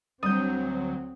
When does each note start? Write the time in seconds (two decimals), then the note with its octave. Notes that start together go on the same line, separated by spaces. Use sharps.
0.23 D2 F#3 G3 C4 D#6 G6